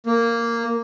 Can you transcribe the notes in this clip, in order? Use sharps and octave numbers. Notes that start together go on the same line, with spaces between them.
A#3